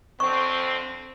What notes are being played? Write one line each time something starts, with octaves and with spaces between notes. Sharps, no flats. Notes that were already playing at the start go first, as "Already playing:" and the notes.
F2 D3 C4 C#6